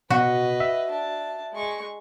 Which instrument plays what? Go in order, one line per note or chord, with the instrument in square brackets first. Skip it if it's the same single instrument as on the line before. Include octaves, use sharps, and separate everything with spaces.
[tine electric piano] B2 [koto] F#4 [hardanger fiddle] B4 D#5
[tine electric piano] E5
[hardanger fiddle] D4 A5
G#3 C#6